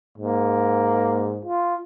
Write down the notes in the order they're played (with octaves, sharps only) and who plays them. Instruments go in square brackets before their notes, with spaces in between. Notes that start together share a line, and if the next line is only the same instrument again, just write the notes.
[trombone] G#2 [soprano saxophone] A#3
[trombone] F4